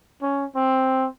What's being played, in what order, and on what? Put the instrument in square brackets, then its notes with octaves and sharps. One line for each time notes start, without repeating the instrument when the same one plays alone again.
[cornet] C#4
C4